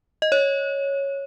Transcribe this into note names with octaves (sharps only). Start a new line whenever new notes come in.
D#5
C#5